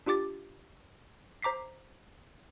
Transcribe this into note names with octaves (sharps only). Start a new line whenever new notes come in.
D4 F4 G4 D6 A6
C5 A#5 D6 B6 C7